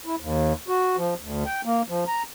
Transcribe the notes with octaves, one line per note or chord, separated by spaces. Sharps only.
E4
D#2
F#4
F3
D2
G5
A#3
F3
A#5